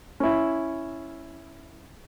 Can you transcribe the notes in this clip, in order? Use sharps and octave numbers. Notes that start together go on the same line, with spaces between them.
C#4 E4